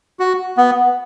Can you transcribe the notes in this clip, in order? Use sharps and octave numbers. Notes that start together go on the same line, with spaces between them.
F#4
B3